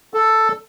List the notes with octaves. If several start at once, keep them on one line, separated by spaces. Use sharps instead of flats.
A4